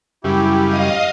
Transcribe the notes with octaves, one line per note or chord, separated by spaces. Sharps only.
F#2 C#3 G3 E4 G4
D#5 F5 D#6